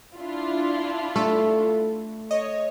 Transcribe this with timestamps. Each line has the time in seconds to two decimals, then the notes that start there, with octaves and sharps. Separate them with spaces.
0.17 D4 E4 F4
1.16 A3 A4
2.31 C#5 D#5